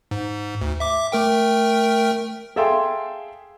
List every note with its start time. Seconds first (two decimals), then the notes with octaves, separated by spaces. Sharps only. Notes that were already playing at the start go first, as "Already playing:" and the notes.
0.11 G#2
0.61 D2
0.80 E5 D6
1.12 A3 A#4 G5
2.56 G#4 A4 E5 F5 G5 C6